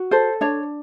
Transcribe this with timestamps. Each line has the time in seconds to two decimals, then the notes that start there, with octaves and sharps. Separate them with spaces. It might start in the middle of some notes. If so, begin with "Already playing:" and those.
Already playing: F#4
0.11 A4 C5
0.41 D4 C#5